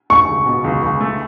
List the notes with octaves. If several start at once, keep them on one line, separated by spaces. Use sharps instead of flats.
A3 C#6
C#2
B2
C#2
C#2
A3